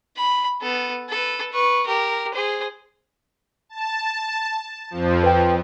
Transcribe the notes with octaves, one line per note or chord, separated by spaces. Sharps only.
B5
B3 A4
A4 B4
B4 C#6
G4 A#4
G#4 C5
A5
F2 F3
B4 G5